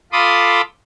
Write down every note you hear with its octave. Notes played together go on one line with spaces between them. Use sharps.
F4 A4 B5 C6 D6 D#6